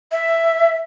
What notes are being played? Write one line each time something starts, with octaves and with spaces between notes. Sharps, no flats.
E5